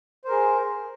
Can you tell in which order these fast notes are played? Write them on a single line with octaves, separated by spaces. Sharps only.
C5 A#4 G#4